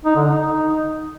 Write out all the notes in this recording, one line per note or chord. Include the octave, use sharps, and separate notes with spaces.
D#4
D3
D#4